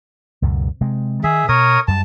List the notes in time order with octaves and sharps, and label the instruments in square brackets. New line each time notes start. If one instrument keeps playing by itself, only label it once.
[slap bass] C#2 F#2 B2
C3 G#3 C4
[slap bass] D#3 [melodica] G#4 E5
[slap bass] B2 [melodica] A#4 C#5 D#6
[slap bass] F#2 G3 [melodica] A5